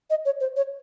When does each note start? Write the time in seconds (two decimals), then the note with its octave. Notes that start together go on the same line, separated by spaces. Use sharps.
0.10 D#5
0.25 C#5
0.40 C5
0.56 C#5